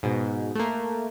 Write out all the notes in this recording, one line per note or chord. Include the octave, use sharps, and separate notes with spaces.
G#2 B2
A3 A#3